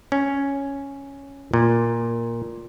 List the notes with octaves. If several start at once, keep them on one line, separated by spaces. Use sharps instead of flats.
C#4
A#2